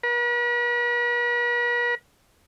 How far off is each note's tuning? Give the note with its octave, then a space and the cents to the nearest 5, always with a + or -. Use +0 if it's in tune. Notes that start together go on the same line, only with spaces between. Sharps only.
B4 -45